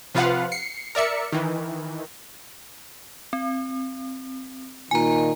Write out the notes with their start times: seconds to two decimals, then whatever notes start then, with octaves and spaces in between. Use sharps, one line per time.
0.15 C3 F3 F4 B4 F5 F#5
0.52 C7 C#7
0.95 A#4 D5 E5 C#7
1.32 D#3 E3
3.33 C4
4.91 A#2 D#3 G#5 A#5